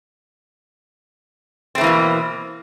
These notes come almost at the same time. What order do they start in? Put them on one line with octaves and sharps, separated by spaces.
C4 A3 E3 A#3 B2